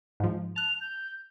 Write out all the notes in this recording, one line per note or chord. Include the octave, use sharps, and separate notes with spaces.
G#2 F3
A5 F#6 F7
G6